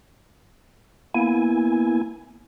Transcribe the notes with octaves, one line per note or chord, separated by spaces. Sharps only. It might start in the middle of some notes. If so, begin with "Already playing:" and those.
A#3 B3 E4 G#5